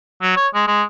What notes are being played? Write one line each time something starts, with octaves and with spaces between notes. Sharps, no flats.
F#3
C#5
G#3
G#3